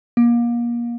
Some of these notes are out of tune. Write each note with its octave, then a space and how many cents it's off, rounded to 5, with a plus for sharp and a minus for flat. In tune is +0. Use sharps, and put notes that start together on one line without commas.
A#3 +30